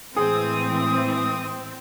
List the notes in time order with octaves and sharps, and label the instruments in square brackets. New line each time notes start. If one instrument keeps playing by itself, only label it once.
[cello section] A2 E3 G#3 [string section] C4 [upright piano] G#4 [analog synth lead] D#6